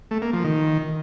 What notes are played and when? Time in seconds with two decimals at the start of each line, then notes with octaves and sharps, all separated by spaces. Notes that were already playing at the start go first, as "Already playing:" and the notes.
0.11 A3
0.22 A#3
0.33 F3
0.44 D#3